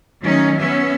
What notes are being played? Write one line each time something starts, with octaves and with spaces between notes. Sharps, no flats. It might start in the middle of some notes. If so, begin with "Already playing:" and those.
D#3 F#3 A3 C#4 D#4
B3 C#4 E5